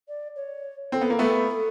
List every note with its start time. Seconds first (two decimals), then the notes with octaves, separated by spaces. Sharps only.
0.08 D5
0.36 C#5
0.92 C4 A4
1.01 B3
1.10 A#3
1.19 A3 B3
1.49 A4